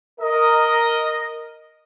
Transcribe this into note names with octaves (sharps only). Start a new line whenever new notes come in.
A#4 D#5